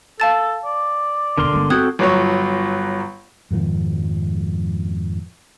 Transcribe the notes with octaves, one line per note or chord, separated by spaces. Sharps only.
A4 F5 A5 A6
D5
E1 D3 A#4 C6
G1 G#3
C4 F#4 A4 G5 D#6 F#6 G#6
G1 F#3 C#5
F2 G#2 D#3 F3